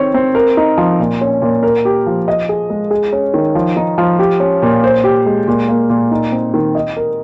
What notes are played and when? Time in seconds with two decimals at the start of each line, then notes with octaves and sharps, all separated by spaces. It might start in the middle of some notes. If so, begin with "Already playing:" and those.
Already playing: D#3 C4 C#5
0.14 C4
0.35 A#4
0.57 D#4
0.78 F3
0.99 A#2
1.21 C#4
1.42 A#2
1.63 A#4
1.85 G4
2.06 F3
2.28 D#5
2.49 G#4
2.70 G#3
2.91 G#4
3.13 C#4
3.34 D#3
3.55 F3
3.77 D#4
3.98 F3
4.19 G4
4.40 C#4
4.62 A#2
4.84 C5
5.04 G4
5.26 G#3
5.48 A#2
5.69 A#3
5.90 A#2
6.11 D#4
6.32 C4
6.54 D#3
6.75 D#5
6.97 A#4